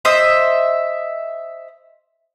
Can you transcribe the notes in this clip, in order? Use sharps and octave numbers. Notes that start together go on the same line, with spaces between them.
C5 D#5 E5